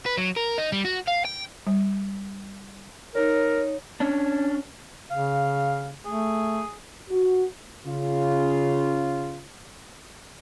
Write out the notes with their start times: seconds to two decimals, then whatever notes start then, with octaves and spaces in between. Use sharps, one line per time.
0.06 B4
0.18 F#3
0.37 A#4
0.58 D#4
0.72 G3
0.85 F#4
1.07 F5
1.25 G5
1.67 G3
3.15 D#4 A#4 C#5
4.00 C#4 D4
5.11 C#3 F5
6.06 A3 G#4
7.09 F#4
7.87 C#3 F4